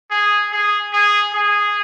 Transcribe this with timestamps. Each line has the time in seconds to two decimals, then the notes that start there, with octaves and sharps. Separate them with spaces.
0.11 G#4
0.52 G#4
0.93 G#4
1.34 G#4